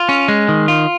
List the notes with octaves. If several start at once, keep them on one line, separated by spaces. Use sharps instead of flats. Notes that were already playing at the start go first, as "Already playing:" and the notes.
Already playing: F4
C#4
G#3
D#3
F4